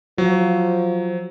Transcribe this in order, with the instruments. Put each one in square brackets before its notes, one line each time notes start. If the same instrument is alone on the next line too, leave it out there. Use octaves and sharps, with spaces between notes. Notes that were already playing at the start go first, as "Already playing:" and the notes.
[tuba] F3 [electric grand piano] F#3